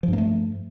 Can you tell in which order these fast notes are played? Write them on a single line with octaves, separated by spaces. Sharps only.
F3 G2 A#3 A3